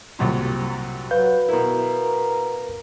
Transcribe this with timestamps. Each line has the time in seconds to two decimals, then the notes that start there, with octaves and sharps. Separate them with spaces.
0.19 C2 F#2 A#2
1.11 F#3 B4 F5 G6
1.49 B2 E4 A#4